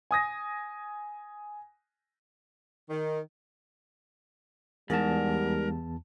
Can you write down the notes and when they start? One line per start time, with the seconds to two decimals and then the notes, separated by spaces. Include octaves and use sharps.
0.11 G#5 D#6 A#6
2.90 D#3
4.90 E2 G#2 G3 A#4 A5